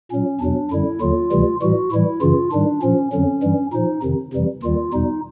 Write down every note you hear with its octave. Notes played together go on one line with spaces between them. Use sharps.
A#2 F#3 C#4
E2 B2 F#3 D4
F#2 D3 G3 E4
D#2 D3 F#3 F4
D2 C3 E3 G3
A2 E3 G3 F#4
A2 E3 G3 E4
F#2 C#3 E3 F4
G#2 D#3 G3 D4
A#2 F3 C#4
F2 D3 F#3 C#4
G2 E3 G3
A#2 F3 D#4
F2 C3 D#3
F2 C3 E3 G3
D#2 D#3 G3 F4
E2 B2 G3 D#4